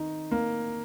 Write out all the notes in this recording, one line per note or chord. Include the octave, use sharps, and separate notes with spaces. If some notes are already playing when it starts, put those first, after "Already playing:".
Already playing: D#3 D#4
A#3